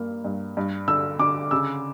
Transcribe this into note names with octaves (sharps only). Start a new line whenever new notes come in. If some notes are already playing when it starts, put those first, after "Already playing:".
Already playing: G2 A#3
G2
G2
D3 E6
D3 D6
C#3 E6